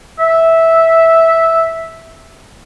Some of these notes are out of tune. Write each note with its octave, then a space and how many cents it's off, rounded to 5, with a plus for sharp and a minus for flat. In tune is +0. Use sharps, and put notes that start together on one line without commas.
E5 -10